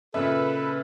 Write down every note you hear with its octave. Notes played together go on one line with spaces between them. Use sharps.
A#2 C#3 A4 B4 E5